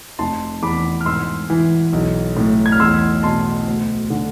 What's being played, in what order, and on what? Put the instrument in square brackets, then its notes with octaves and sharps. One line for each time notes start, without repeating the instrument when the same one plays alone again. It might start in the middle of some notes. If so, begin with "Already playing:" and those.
[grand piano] F1 A5 C6
E2 B5 D6
F6
G#2 C6 E6
E3
B1
A2
G#6
F6
E2 C6 E6
B2 A5 C6
D2
D3